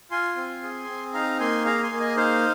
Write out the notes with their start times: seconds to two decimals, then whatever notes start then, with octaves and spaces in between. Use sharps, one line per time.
0.11 F4 G#5 C6
0.36 C4
0.63 G#4
0.89 C4
1.14 D#4 F5 A#5
1.39 A#3 G#5 C6
1.65 G#4 F5 A#5
1.83 G#5 C6
1.92 A#3
2.00 D#5 G#5
2.17 D#4 C5 F5